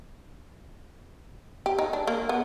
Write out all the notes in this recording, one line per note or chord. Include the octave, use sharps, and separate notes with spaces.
G4
D#4
D4
A#3
B3